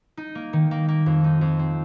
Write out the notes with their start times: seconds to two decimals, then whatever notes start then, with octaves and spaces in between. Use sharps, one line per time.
0.17 D#4
0.35 A#3
0.53 D#3
0.71 A#3
0.88 A#3
1.06 F2
1.24 D#4
1.41 F2
1.59 C4